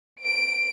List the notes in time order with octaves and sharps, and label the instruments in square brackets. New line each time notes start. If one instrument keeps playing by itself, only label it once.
[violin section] D7